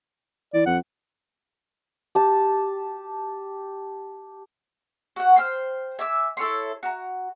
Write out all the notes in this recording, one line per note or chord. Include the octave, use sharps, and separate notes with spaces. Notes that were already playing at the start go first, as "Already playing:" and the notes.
E3 D5
F2 F#5
G4 A5
F#4 F#5
C5 G5 F6
E5 G#5 D6 E6
E4 A4 C#5 C6
F#4 A#5